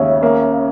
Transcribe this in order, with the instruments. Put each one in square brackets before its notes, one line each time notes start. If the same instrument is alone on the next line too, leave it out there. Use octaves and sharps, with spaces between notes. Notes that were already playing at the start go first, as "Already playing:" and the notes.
Already playing: [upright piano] D#2 C#3 [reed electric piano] C#5 E5
[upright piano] A#3